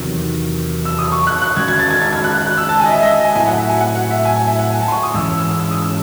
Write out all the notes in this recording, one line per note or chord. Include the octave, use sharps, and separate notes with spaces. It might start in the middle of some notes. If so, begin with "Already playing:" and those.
Already playing: E2 C3 D#3 F#3
E6
D#6
C#6
F#6
F#6
D#3 G#3 C#4 F#4 G#6
G#6
A6
G#6
G#6
G#6
F#6
F#6
F#6
E6
A5
G#5
D#5
E5
D#5
G#5
A2 F#3 A3 C4 E4 G#5
F#5
E5
G#5
F#5
F#5
E5
G#5
G#5
E5
F#5
G#5
A5
C6
C#6
D#6
G#2 E3 G#3 C#4 E6
E6
E6
D#6
E6